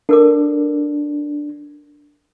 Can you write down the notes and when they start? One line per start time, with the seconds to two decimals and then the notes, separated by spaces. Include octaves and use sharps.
0.09 D4 A4 A#4 D6